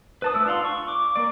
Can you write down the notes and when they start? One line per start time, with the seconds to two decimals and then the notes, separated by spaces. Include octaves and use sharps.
0.22 B4 A5 D#6
0.34 A3 E4 E6
0.46 D4 F4 F5 F#5 C6
0.65 C#6
0.88 D6
1.16 A#3 D5